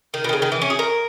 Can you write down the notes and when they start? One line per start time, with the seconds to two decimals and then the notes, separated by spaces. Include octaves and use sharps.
0.14 D#3
0.24 B2
0.29 D#3
0.33 C#3
0.42 D#3
0.52 E3
0.62 C#4
0.70 G#4
0.79 A#4